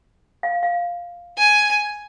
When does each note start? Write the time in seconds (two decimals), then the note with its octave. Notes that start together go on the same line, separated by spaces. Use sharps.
0.43 F5
0.63 F5
1.38 G#5